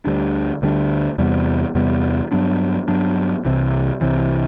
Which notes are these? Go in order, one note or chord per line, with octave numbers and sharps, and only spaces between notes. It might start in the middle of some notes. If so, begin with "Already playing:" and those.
D2 D3 G3 D4
D2 D3 G3 D4
E2 C3 G3 B3
E2 C3 G3 B3
G2 F#3 B3 D4
G2 F#3 B3 D4
C2 C3 E3
C2 C3 E3